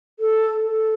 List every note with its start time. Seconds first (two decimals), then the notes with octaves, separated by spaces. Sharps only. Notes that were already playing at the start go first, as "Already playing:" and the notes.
0.19 A4
0.64 A4